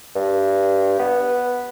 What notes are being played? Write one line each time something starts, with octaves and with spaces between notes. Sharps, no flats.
G2
B3